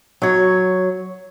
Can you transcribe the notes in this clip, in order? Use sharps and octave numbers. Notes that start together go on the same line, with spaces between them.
F#3 C#5